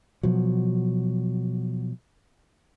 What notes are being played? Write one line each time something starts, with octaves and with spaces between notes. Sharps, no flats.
B2 F3 F#3